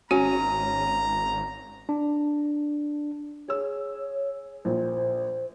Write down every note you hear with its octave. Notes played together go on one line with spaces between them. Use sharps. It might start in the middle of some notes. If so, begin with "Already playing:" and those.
G#1 C#4 F#4 A#5
D4
G#4 C#5 E6
A#1 A#2 C5